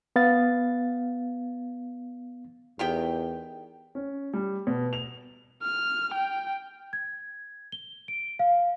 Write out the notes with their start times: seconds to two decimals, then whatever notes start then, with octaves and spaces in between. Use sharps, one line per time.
0.16 B3 F5 A6
2.79 E2 D#3 G4 G5
3.95 C#4
4.34 G3
4.67 B2
4.93 F7
5.63 F6
6.14 G5
6.93 G#6
7.72 G7
8.08 D7
8.39 F5